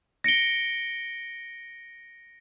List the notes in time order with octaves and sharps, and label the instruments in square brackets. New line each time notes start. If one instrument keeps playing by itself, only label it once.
[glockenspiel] A#6 C#7 D7 G7